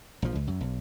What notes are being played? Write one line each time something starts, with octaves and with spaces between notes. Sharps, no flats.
A#1 F3
C#2
F#2
B1